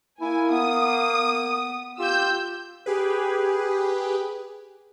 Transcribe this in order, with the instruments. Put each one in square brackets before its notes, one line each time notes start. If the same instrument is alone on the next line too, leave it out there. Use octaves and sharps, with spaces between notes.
[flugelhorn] A#3 [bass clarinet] E4 [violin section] G#5
[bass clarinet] B3 [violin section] D#6
[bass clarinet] B3
[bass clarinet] F4 [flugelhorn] G4 [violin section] E6 G6
[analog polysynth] G4 G#4 B4